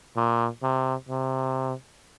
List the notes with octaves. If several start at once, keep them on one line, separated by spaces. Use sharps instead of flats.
A#2
C3
C3